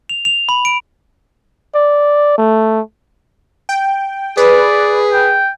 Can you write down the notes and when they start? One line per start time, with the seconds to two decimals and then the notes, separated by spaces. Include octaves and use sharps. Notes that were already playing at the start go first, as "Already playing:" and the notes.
0.09 F7
0.25 F7
0.49 B5
0.65 D7
1.75 D5
2.38 A3
3.69 G5
4.37 G#4 B4 D5
5.12 G5